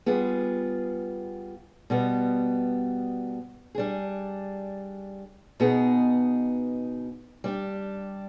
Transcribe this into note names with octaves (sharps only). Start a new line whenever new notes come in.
G3 B3 F4 G#4
B2 G3 B3
G3 D4 G#4
B2 B3 D#4 G#4
G3 D4 G4